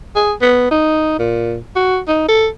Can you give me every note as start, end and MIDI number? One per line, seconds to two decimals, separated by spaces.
0.15 0.32 68
0.41 0.66 59
0.71 1.19 63
1.19 1.58 46
1.76 1.98 66
2.08 2.24 63
2.28 2.47 69